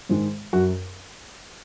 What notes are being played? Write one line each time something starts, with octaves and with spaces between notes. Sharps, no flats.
G#2 D#3 G#3
F#2 F#4